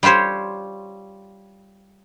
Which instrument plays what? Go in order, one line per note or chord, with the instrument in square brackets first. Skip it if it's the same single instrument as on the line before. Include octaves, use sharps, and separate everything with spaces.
[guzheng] G3 F4 G4 C5 C#5